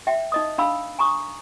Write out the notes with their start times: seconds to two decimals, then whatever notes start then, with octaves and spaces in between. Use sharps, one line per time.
0.07 E5 G5
0.32 D#4 D#5 D#6
0.58 D4 F5 B5 E6
0.99 G#5 A#5 C#6 D#6